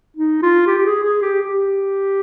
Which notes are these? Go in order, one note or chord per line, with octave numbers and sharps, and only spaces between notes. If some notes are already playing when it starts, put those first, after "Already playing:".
D#4
F4
G4
G4
G#4
G#4
G4
G4